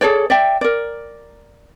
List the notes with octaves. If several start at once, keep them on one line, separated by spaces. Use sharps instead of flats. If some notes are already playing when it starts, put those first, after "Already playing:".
G#4 A4 C#5 D5
D5 E5 G5
A#4 D5